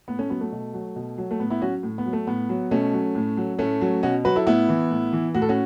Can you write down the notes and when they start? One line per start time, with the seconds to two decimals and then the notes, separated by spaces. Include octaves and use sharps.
0.08 A2 B3
0.19 A3 C#4
0.30 F#3 B3
0.41 A3
0.52 B2
0.74 F#3
0.96 B2
1.18 F#3
1.31 A3
1.40 A2 B3
1.50 B3 E4
1.62 F#3 C#4 F#4
1.83 A2
1.98 B3
2.06 F#3
2.13 A3
2.27 A2 B3
2.49 F#3
2.71 B2 A3 C#4
2.93 F#3
3.15 A2
3.37 F#3
3.58 A2 A3 C#4
3.81 F#3
4.03 B2 C#4 F#4
4.25 F#3 F#4 B4
4.36 E4 A4
4.46 A2 B3 E4
4.69 E3
4.91 A2
5.13 E3
5.34 A2 F#4
5.42 A4
5.49 C#4 F#4